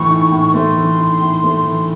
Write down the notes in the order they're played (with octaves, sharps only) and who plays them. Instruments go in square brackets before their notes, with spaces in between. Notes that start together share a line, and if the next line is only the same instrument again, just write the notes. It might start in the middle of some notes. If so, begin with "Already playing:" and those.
Already playing: [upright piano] A2 E3 A3 [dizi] C#6
[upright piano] D#4
A2
[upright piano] A3 [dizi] C6
[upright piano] E3
D#4
A2
A3
E3